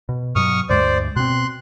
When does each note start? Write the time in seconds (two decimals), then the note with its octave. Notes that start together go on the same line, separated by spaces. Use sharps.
0.09 B2
0.36 G2 B2 F#3 C#6 D#6 F6
0.70 D2 G2 G#3 C5 D5
1.16 B2 C4 C6 F#6